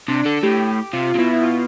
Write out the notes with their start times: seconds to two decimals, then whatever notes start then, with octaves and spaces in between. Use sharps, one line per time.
0.08 C3 D4
0.25 D3 A4
0.37 A4
0.43 A2 G4
0.93 C3 F4
1.15 C3
1.18 B2 E4
1.33 E4
1.43 F4